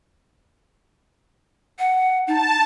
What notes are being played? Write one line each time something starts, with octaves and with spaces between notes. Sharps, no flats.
F#5
D#4 A5